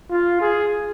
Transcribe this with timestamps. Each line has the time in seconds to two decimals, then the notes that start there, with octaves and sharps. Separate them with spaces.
0.11 F4
0.41 G#4